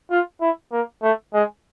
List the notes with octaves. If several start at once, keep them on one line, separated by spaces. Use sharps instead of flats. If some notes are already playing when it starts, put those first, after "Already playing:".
F4
E4
A#3
A3
G#3